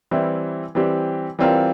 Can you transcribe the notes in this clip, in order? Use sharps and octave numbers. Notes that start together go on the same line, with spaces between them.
E3 G3 C4 E4
E3 G3 C4 G4
E3 G3 C4 F4 A#4